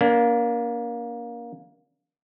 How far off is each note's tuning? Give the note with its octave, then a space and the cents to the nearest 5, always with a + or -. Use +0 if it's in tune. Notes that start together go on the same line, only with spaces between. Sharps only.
A#3 +20 D4 -40